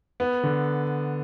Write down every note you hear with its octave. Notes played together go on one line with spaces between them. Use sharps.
B3
D3